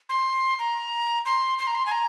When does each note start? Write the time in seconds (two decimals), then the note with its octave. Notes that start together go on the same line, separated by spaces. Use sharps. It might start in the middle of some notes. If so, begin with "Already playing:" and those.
0.09 C6
0.59 A#5
1.25 C6
1.59 C6
1.67 A#5
1.75 C6
1.86 G#5
1.92 A#5